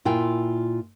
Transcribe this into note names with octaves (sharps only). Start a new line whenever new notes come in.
A#2 E4 F4 G5 G#5